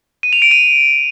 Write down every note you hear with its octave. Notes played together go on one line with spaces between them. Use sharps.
D#7
F7
D7
D#7